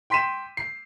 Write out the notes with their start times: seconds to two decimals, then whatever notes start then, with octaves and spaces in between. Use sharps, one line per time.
0.10 G5 C6 B6 D#7 E7
0.57 C7